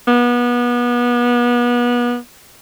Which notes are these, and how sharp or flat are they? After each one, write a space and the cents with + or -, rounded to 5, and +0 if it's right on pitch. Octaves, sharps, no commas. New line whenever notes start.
B3 -30